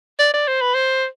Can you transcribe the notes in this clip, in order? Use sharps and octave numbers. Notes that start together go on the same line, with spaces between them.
D5
D5
C5
B4
C5